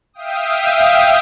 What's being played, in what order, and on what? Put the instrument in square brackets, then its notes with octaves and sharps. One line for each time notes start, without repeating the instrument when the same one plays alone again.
[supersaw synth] E5 F5 G5 D#6